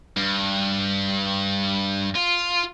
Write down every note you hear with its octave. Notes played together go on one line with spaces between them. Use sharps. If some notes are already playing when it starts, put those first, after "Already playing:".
G2
F4